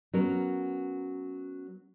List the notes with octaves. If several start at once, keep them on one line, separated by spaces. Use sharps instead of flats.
F#3 B3 C#4 A#4